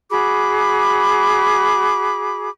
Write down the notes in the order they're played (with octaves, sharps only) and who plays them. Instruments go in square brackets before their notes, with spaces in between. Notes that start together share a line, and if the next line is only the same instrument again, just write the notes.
[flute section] F#4 G#4 B5 D6